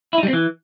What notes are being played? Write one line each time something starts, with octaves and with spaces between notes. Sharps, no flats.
E4
D#4
G3
C4
E3